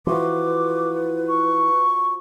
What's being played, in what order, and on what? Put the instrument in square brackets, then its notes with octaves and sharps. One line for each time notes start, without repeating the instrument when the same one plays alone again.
[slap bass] E3 [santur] F3 F#4 C6 [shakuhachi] B4 [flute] D6
[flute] C#6